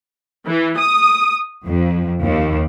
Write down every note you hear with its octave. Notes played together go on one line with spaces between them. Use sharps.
E3
D#6
F2
D#2